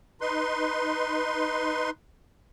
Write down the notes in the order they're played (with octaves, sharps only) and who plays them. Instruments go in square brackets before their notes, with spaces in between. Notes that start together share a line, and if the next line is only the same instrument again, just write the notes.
[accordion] D#4 B4 C6